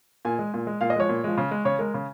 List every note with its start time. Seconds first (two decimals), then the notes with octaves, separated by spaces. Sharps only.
0.25 A#2 G#5
0.39 G#3
0.54 A#2
0.67 G#3
0.81 A#2 F5
0.90 D#5
0.96 F3 G#3 C#5
1.09 A#2
1.24 F3 G#3
1.38 C#3
1.51 G#3
1.65 C#3 C#5
1.79 G#3 A#4
1.94 C#3